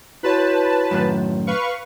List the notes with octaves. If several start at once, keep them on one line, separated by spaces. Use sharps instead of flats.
E4 F#4 B4 C#5 A5
F#2 A2 D#3
B4 F5 C#6